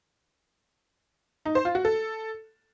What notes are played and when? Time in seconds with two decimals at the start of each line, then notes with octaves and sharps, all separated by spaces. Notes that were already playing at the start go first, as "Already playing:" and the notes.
1.46 D#4
1.55 C5
1.65 F4
1.75 F#4
1.85 A4